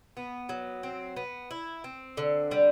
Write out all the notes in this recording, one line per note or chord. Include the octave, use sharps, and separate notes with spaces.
B3
F#3
C4
B3
E4
C4
D3
G3